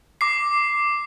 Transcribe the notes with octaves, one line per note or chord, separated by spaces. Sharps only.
D6 C7